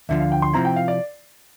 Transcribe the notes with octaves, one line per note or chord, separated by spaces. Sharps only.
D2 D3 F3 E5
F5
G5
C6
C3 F3 C4 E4 A#5
G5
F5
D5